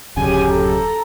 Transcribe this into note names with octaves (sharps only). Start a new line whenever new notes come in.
D1 F#2 C#3 G4 G#5
A4 A#5